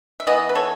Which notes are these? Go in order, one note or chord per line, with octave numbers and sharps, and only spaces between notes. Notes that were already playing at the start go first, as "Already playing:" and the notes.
E5
E3 B3 B4 D#5
B4
A4 C#5